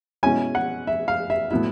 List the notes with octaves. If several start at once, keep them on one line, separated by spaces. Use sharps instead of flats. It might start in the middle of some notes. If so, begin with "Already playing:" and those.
B2 G#3 C#4 E4 G#5
F#5
E5
F5
E5
A2 F#3 B3 E4 E5